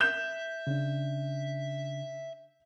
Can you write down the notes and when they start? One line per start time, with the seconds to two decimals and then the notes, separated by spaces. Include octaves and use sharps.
0.01 E5 G6 E7
0.67 C#3 D4